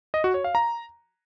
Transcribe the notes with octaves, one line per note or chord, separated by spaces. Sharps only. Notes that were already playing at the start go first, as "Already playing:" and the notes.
D#5
F#4
C#5
F5
A#5